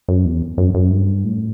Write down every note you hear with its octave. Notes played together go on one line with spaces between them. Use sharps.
F#2
E2
F#2
F#2
G2
A2